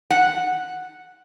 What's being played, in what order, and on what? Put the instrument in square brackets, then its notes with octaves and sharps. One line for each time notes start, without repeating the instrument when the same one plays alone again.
[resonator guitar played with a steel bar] F#5